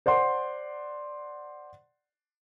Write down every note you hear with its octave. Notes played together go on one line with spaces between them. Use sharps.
C5 D5 F#5 C6